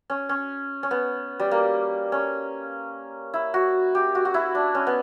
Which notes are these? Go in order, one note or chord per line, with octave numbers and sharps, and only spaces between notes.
C#4
C#4
C#4
B3
G3
A#3
C#4
E4
F#4
G4
F#4
F#4
E4
D4
C#4
B3